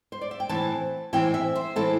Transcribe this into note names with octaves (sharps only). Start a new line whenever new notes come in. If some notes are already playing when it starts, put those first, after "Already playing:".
C5
D5
E5
G5
A2 E3 C4 E4 A5
A2 E3 C4 E4 G5
E5
C5
A2 E3 C4 E4 A4